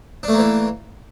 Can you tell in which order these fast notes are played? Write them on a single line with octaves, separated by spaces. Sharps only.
D4 A3 A#3 E3